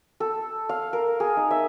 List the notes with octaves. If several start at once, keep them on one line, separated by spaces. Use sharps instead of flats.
A4
F5
A#4
G#4
D#4
E5